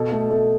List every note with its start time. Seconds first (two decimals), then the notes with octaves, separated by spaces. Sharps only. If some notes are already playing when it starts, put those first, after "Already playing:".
Already playing: B2 A4
0.12 A3
0.31 A3